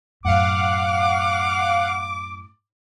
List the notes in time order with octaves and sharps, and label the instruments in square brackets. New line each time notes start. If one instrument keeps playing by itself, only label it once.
[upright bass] F#2 A2 [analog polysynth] F5 F#5 [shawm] D6